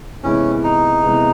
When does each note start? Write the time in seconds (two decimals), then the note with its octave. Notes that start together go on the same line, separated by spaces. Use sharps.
0.23 C3 E3 G#3 B3 C#4 E4
0.64 D#4
1.03 C3 E3 G#3 B3 E4